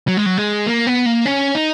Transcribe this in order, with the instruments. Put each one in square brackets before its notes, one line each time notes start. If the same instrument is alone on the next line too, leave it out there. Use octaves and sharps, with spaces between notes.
[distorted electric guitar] F#3
G#3
F#3
G#3
A#3
B3
A#3
C#4
D#4